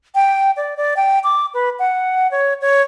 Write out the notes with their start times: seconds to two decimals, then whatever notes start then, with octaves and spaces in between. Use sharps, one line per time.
0.15 G5
0.57 D5
0.77 D5
0.97 G5
1.24 D6
1.54 B4
1.79 F#5
2.31 C#5
2.61 C#5